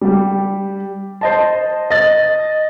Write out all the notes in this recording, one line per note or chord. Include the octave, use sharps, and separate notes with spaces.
G3 G4
C5 D#5 A5
D#5 A6